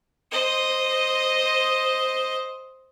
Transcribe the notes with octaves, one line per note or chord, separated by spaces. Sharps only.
C5 D#5